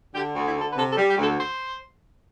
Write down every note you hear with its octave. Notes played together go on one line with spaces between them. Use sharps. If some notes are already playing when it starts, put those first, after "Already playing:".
D3 G4
D2
E4
D3 A4
B4
C3 A4
A4
G3
G4
D2
A4
C5